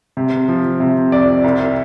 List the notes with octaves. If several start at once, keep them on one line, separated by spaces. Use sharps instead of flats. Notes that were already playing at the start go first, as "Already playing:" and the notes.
C3
F3
C3
F2 D5
C2